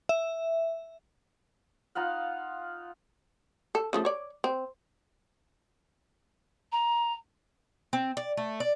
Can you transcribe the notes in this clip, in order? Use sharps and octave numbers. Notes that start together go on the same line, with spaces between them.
E5
D#4 F4 F5 F#5
A4
C#3 F3 A3
C#5 D5
C4
A#5
C4
D5
A3
D5